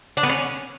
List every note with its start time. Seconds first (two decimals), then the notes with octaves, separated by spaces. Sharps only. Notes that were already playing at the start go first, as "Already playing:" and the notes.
0.17 D4
0.23 B3
0.29 C#4